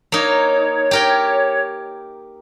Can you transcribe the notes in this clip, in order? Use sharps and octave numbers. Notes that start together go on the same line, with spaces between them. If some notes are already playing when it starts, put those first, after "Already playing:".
A#3 D#4 C#5
G4 A#4 G5